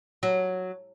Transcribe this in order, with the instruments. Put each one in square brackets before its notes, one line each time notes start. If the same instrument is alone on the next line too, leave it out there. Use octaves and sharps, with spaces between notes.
[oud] F#3